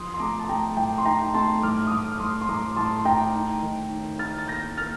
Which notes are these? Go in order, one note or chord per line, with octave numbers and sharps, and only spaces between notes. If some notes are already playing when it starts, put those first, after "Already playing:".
Already playing: F3 C6 D#6
C6
A3 A#5 D6
A5
A3 G5 A#5
A2 G5
C6
D#4 G5 A#5
A3 A5 C6
A2 D6 F6
D#6
A2 D6 F6
F6
A2 C6 D#6
C6
A2 A#5 D6
A2 A5 C6
C6
A2 G5 A#5
D#4
D#3
D#4
D#4 F6 A6
A6
A#3 G6 A#6
A#3 F6 A6